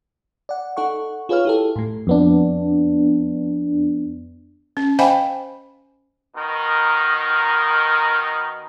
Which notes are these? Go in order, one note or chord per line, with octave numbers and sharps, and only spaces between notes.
D5 F#5
D#4 A4 F#5 C#6
F4 G#4 B4 C#5 F5 F6
E4 G4 A4
A2 A3
F2 B3 D4
C#4
C5 D#5 F5 G5 G#5 B5
B2 D#3 D#4 A#4